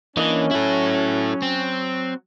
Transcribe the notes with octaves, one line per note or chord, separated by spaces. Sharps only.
E3 A#3 C#4 D4 D#5
F#3 E4 F#4 A4
C4